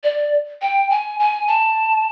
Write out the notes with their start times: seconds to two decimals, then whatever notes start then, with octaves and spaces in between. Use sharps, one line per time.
0.03 D5
0.62 G5
0.90 G#5
1.20 G#5
1.48 A5